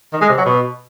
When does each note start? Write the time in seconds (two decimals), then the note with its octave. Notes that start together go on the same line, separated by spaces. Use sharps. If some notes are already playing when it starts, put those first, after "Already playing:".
0.13 D#3
0.21 G#3
0.30 C3
0.38 F#3
0.46 B2